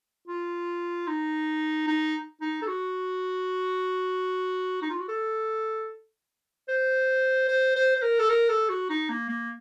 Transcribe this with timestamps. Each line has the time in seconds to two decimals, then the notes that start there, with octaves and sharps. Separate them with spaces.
0.27 F4
1.08 D#4
1.87 D#4
2.41 D#4
2.62 A4
2.67 F#4
4.82 D#4
4.90 F4
4.99 F#4
5.09 A4
6.68 C5
7.48 C5
7.76 C5
7.96 C5
8.02 A#4
8.19 A4
8.30 A#4
8.49 A4
8.70 F#4
8.90 D#4
9.09 A#3
9.29 A#3